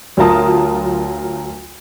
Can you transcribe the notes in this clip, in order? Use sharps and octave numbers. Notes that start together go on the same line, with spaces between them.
D2 F#3 F4 A#4 A5 D#6